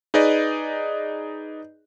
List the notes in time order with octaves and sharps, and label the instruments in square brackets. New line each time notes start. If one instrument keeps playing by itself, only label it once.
[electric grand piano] D#4 G#4 B4 D5 D#5